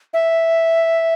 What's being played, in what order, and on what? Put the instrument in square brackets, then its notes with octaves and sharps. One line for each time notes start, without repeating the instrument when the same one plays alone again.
[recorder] E5